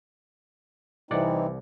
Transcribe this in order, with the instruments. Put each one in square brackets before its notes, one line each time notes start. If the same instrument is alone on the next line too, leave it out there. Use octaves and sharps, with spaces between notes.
[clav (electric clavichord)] C2 D5 F#5 [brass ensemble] E3 [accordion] C4 D#4